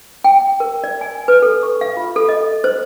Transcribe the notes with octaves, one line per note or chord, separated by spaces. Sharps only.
G5
A#4
D5
G#5
B4
A4
C#6
F5
F4
A4
D#5
C5